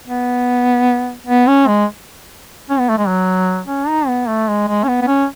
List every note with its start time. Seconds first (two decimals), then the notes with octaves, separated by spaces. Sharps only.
0.07 B3
1.27 B3
1.47 C#4
1.67 G#3
2.70 C#4
2.79 B3
2.89 A3
2.98 G#3
3.08 F#3
3.67 C#4
3.88 D#4
4.07 B3
4.28 A3
4.48 G#3
4.68 G#3
4.83 C#4
4.88 B3
5.02 B3
5.07 C#4